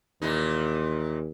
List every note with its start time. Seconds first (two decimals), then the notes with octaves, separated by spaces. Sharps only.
0.22 D#2 A#2 E3 D#4